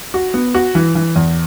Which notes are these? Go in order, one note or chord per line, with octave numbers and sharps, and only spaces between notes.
F#4
B3
F#4
E3
E3
E2